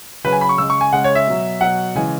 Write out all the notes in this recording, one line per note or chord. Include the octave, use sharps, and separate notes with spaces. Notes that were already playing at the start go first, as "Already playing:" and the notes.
C#3 F#3 B4
G#5
B5
C#6
C#3 G#3 E6
C#6
G#5
C#3 G#3 F#5
C#5
E5
B2 F#3
B2 F#3 F#5
C#3 E3 G#3 G#5